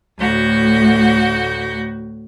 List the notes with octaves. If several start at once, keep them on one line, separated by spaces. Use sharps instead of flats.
D2 A2 F#4 G6